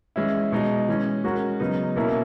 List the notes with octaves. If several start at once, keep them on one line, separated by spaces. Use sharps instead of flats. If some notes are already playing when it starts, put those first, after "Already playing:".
E3 G#3 C#4 E4
B2 G#3 D#4
E3 G#3 C#4
G#3 C#4 F#4 A#4
C#3 F#3 B3 D#4
B2 A#3 C#4 E4 A#4